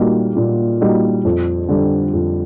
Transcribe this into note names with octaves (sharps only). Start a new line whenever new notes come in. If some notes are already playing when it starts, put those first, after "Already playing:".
Already playing: A#2 G3 A#3 D#4 F#4
A#2
G3 A#3 D#4 F#4
F2
D3 G3
F2